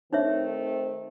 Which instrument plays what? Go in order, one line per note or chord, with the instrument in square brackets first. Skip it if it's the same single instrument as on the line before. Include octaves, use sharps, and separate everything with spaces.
[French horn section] D#3 A3 C4 [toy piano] D#4 C#5 E5